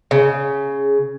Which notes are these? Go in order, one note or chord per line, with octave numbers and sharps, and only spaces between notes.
C#3